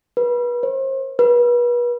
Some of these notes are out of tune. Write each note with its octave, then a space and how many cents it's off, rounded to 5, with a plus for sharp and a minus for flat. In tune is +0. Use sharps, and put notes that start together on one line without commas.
B4 -30
C5 +40
B4 -35